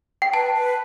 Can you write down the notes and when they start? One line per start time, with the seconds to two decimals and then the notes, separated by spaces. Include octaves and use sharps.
0.22 G5
0.33 B4 A5
0.55 B4